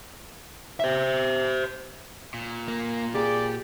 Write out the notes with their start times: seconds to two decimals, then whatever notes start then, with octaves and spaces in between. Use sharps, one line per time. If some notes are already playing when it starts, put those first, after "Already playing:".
0.80 C5 E5
2.34 A#2
2.68 A#3
3.15 A#3 C4 G4 G#4 D5